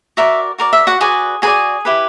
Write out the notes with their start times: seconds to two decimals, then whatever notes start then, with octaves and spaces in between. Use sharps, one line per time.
0.17 F#4 A#4 D5 E5
0.58 F#4 A#4 D5
0.73 E5
0.87 F#4 F#5
1.01 F#4 G#4 B4 D5 G#5
1.42 F#4 G#4 B4 D5 G#5
1.85 E4 G4 B4